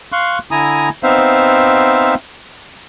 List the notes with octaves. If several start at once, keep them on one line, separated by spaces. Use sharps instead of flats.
F5 C6 C#6 F#6
D3 E4 G#5 A#5 D#6
B3 C4 D#4 C5 E5 F5